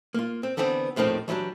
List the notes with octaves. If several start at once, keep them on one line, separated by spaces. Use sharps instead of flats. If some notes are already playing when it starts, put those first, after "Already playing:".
A#3 F4
C4
D3 E3 B3 C4 D4
D#2 A2 D#3 F3 C4
E3 F#3 G3 C4 D4